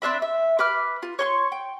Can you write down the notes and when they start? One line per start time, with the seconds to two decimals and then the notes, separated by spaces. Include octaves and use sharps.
0.02 C4 D4 E5 B5
0.22 E5
0.59 B4 B5 D6 F6
1.03 F4
1.19 C#5 C6 C#6
1.52 G5